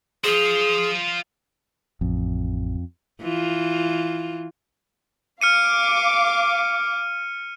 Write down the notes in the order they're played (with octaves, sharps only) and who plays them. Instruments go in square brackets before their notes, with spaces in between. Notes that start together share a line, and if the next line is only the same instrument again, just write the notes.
[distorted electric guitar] F4 C5 [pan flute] G#4
[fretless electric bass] A1 [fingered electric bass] F2
[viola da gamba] E3 F4
[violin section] F5 D6 [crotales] F6 C#7 D#7